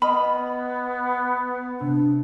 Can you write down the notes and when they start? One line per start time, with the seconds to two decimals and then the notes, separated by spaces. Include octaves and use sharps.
0.02 B3 D#5 B5 F6
1.80 C3 D4